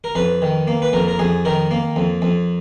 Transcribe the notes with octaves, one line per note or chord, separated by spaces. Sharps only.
A#4
F2 B4
D#3
A#3
B4
F2 A#4
A#4
F2 G#4
D#3 A#4
A#3
F2
F2